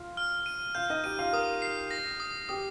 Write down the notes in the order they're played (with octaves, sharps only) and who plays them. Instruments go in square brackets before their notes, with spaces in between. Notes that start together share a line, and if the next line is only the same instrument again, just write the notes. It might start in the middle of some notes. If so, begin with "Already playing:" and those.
Already playing: [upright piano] F4 F5
[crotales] F6
D#7
[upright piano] F4 F5 [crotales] G6
[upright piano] D#4 D#5
[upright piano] G4 G5 [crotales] D#7
[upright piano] F4 F5
[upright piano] A#4 [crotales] D#6
[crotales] C7
A#6
D#6
[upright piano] G4 [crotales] D#6